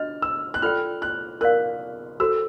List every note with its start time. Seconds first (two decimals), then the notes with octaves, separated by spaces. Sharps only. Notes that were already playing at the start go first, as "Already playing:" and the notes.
Already playing: D4 F#4 D#5 F6
0.22 E6
0.54 F#6
0.62 F4 A4 D5 G5 F6
1.02 F#6
1.41 A#4 D5 F5 F#6
2.20 F#4 A4 C5 E6